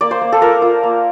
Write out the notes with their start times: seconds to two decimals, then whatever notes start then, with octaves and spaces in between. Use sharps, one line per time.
0.01 A#3 D5
0.11 C5
0.21 A#3
0.32 A4
0.42 F4 A#4
0.62 F4
0.83 A#3